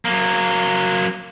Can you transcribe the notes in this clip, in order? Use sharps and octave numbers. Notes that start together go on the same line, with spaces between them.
F#3 A#3